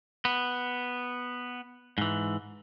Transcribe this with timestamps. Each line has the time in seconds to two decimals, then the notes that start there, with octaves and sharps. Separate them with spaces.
0.25 B3
1.98 G#2 E3